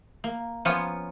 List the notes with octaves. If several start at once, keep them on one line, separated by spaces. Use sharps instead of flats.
A#3
F3 B3 C#4 F4 A#4 C#5